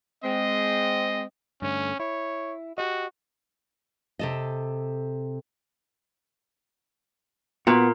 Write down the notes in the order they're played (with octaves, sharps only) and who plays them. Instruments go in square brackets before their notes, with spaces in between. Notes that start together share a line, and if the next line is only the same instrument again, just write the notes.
[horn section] G#3 C4 [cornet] D#5
[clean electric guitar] G2 D3 A3 [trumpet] C#4
[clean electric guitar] E4 [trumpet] C#5
[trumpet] F#4 [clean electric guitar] G4 D#5
[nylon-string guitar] C3 A4 D#5
[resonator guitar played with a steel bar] A#2 [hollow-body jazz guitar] B3 F#4